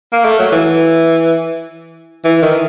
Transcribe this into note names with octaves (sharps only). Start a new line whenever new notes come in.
A#3
A3
F#3
E3
E3
D#3